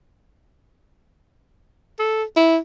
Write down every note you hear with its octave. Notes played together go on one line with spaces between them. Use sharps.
A4
E4